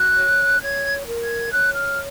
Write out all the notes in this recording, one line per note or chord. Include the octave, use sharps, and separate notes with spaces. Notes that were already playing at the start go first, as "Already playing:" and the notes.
Already playing: F#4 F#6
C#5
C#5 G#6
A#4
G#6
C#5 F#6
F6